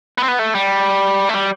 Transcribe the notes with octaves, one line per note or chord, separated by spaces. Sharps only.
B3
C4
B3
A3
G3
A3
G3